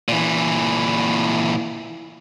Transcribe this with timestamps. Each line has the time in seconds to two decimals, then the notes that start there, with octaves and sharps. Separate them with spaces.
0.08 A#2 E3